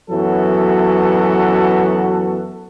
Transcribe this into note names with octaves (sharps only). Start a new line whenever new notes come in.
F#2 E3 F#3 B3 F#4 A4